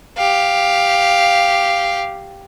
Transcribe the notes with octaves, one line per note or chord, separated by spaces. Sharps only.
G4 F5